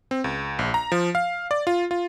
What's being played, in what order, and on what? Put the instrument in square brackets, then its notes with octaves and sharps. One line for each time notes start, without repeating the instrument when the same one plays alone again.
[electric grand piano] C4
C#2
A#1
A#5
F3
F5
D5
F4
F4